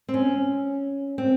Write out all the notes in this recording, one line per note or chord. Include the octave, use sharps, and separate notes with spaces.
C4
C#4
C4